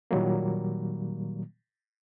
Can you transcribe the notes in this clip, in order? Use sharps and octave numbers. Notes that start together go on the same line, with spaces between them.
A#2 D#3 F#3 G3 A#3